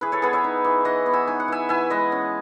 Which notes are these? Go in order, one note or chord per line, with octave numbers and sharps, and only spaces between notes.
E3 G#4 B4
A4 C#5
B3 G#4 B4
C#5 E5
D#4
E3
E3 D#5 F#5
B3
E5 G#5
D#4 G#5
F#5
E3 E5 G#5
E3 E5 G#5
G#3 B4 D#5
C#4